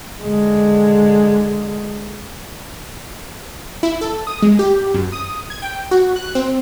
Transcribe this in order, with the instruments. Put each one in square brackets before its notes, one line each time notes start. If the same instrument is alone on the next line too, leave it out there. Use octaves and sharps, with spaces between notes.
[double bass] D3 G#3
[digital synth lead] E4
A4
D#6
G#3
G4
F#2
D#6
G#6
G5
F#4
F#6
C4